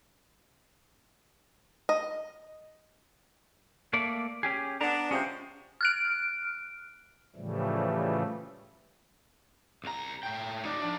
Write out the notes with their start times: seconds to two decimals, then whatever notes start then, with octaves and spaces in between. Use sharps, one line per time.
1.89 D#5
3.93 A3 A#3 D5
4.43 C#4 G4 G#4
4.81 B3 D4 A#5
5.11 C3 F3 G#3 C#4 C5
5.81 F6 F#6 D7
7.36 A2 C#3 E3 F3 G3 A3
9.84 C2 A#5
10.23 A2 G5
10.65 D#4 D5
10.82 F3 D4